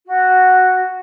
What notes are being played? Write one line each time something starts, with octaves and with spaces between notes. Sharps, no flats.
F#4